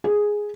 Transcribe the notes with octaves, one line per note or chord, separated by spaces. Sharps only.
G#4